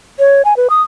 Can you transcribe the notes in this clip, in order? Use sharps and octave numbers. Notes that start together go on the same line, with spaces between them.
C#5
G#5
B4
D#6